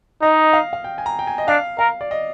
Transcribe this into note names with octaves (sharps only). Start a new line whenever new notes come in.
D#4 D#5
F5
F5
G5
G#5
A#5
G5
G#5
D#5
D4 F5
A#4 F5
D5
D#5